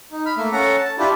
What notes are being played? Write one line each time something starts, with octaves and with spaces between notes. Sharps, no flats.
D#4
B5 F6
A3 A#3 E5
C#4 A4 F#5 A#5
A5
D4 E4 F4 G4